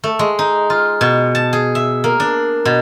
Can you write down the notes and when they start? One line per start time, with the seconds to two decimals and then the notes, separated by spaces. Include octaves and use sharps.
0.04 A3
0.19 G#3
0.39 D#4
0.70 F4
1.01 B2
1.35 A5
1.53 G#4
1.75 E5
2.04 A#3
2.20 D4
2.65 B2